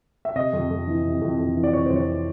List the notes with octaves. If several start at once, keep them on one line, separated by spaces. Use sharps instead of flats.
E5
C3 D#5
F2
F2
E3
C3
F2
F2
E3
D5
C3 C#5
F2 C5
C#5